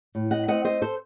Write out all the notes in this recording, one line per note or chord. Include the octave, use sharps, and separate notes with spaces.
A2
D#5 F#5
A3 C4 D#5 F#5
C5 D#5
A4 C5